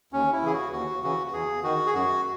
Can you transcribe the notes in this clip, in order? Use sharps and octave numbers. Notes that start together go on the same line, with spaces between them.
D#2 C#4
E4
C#3 E3 G#4
F#4
D#2 F#4
C#3 E3 F#4
F#4
E2 G#4
D#3 F#4
G#4
F#2 F#4